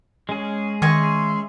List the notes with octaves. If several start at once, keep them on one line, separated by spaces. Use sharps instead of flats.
G#3 C#4 G#4
D#3 C#4 D#5 E5 G#5 C6 C#6